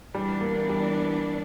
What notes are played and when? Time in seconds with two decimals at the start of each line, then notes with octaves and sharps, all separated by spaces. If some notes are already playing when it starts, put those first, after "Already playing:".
0.14 E3 G3 B3 D4
0.41 A#3
0.69 G3